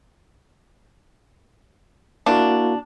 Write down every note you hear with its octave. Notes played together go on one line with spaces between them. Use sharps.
A#3 D4 E4 F#4